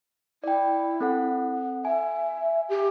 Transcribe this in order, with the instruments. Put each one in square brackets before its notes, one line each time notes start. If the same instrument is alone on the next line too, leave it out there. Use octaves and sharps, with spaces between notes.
[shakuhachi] E4 [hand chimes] D5 G5
[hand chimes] C4 A4 F#5
[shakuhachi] E5 [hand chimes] G#5
[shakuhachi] G4